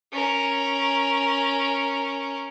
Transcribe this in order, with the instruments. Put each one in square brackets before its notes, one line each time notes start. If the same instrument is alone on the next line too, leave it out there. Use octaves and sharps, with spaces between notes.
[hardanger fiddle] C#4 A#4